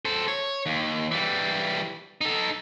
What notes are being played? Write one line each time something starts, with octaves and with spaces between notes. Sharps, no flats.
A4 C5
C#5
D#2
E3 G3
D#4 A4